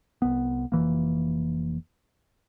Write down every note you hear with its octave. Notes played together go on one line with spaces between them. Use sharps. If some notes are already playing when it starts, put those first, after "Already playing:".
C2 B3
F1 E2 E3 A#3